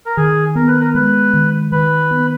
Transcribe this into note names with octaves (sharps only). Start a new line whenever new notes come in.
A#4
D#3 G#4
B3 A#4
B4
A#4
G#3 B4
D#3
D#3 B4
B3